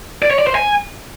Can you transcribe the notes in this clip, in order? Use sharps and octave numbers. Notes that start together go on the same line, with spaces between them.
D5
C#5
D5
C5
G#5